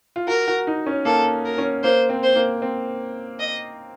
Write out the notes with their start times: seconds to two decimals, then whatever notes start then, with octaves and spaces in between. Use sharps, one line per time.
0.16 F4
0.27 F#4 A#4
0.47 F#4
0.67 D#4
0.86 C#4
1.05 A#3 A4
1.45 A#4
1.58 C#4
1.84 A#3 C5
2.09 C4
2.23 C5
2.35 A#3
2.62 C4
3.40 D#5